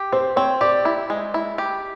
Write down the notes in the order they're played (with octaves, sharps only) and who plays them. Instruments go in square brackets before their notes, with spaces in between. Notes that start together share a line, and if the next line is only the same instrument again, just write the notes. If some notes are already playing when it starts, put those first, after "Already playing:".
Already playing: [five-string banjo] G4
[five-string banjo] C4 [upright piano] C5
[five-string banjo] C4 [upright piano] C#5
[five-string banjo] G4 [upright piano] D5
[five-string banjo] E4
G#3
E4
G4